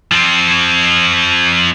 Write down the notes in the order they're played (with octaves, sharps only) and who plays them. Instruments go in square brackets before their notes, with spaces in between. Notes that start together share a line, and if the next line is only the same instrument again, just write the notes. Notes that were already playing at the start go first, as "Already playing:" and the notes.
[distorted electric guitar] F3 C4